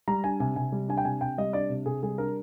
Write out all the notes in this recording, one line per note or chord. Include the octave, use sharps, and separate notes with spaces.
G3 A#5
D4 G#5
C3 G#5
C3 G#5
G3
D4 G#5
G5
C3 G#5
C3 G5
G3 D#5
D4 D5
C3
C3 G#4
G3 G#4
D4 A#4